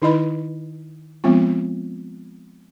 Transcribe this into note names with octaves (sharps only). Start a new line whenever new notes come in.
D#3 D#4 E4 B4 D#5 B5
F3 G#3 B3 C4 F4